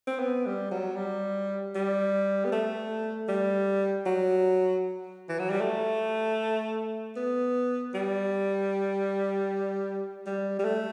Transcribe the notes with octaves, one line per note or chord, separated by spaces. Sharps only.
C4
B3
G3
F#3
G3
G3
B3
A3
G3
F#3
E3
F#3
G3
A3
B3
G3
G3
G3
A3